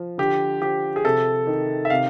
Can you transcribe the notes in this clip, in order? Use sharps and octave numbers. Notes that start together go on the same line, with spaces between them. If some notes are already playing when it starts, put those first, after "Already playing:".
Already playing: F3
D3 G4
F3 G4
G#4
C3 A4
D#3
E5
C3 F5